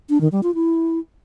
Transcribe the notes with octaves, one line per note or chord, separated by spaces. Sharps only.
D4
D#3
G3
F4
E4